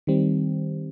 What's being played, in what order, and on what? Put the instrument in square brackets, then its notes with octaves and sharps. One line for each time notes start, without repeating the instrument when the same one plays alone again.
[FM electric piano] D#3 G3 C4